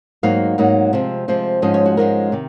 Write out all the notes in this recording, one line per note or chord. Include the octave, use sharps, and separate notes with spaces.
G#2 F#3 A#3 D#4 F5
G#2 F#3 A#3 D#4
C3 F3 G#3 C4
C3 F3 G#3 C4
G#2 F3 G#3 C#4 D#5
C#5
F#4
G#2 F3 G#3 C#4 A#4
C3 D#3